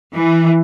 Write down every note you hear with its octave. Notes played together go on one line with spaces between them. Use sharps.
E3